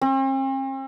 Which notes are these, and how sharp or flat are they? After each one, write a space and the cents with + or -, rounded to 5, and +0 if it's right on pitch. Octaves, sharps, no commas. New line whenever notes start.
C4 +45